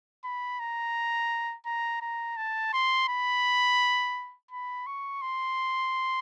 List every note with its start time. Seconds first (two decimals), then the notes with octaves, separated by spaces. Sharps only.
0.24 B5
0.60 A#5
1.66 A#5
2.01 A#5
2.37 A5
2.73 C6
3.08 B5
4.51 B5
4.87 C#6
5.22 C6